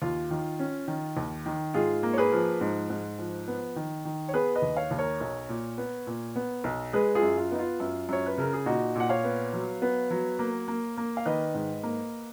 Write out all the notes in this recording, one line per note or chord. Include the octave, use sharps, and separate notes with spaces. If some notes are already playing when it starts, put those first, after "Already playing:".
D#2 F4
D#3
C#4
D#3
D#2
D#3
G#2 F4 G#4
A#3
C#5
G#4 B4
F3
G#2
G#2
F3
B3
D#3
D#3
C#5
B3 G#4 B4
B4 D#5
D#2
C#5 F5
D#2
A#4 C#5
B1
A#2
B3
A#2
B3
B1
G#3 G#4 B4
F4 G#4
F#2
F4
B3 D#4
F4
F#2
F#2 C#5
B4
C#3 A#4
G#4
A#2 D#4 F#4
A#2 F#5
C#5 F5
B3
F#3
B3
F#3
A#3
A#3
A#3
F5
D#3 B4 D#5
G#2
A#3